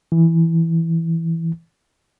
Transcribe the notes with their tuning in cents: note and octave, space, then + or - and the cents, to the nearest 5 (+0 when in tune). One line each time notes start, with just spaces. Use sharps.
E3 +0